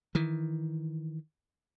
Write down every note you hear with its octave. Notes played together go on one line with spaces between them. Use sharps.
D#3 E3